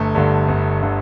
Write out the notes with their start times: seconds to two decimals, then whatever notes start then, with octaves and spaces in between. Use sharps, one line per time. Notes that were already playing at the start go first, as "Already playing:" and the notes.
Already playing: G1 A3
0.15 G2 D3
0.48 G1
0.83 D3